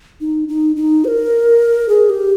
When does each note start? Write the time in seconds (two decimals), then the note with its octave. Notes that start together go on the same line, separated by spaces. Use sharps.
0.21 D#4
0.49 D#4
0.76 D#4
1.05 C5
1.08 A#4
1.89 G#4
2.10 G4